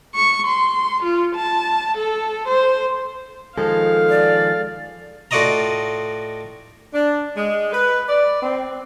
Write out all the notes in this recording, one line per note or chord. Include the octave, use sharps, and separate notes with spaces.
C#6
C6
F4
A5
A4
C5
D#3 F3 G#3 A4 F5
D5
A2 F4 F#4 D5 D#5 A#5
D4
G#3
B4
D5
C4